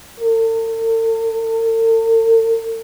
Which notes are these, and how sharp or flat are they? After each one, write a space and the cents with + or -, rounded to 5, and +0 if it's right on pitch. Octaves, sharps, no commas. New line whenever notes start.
A4 +45